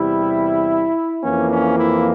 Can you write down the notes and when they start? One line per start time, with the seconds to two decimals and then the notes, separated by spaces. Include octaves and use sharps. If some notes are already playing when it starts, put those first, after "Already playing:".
Already playing: E2 C3 G3 E4
1.23 F2 E3 A#3 C#4
1.51 C#4
1.79 E4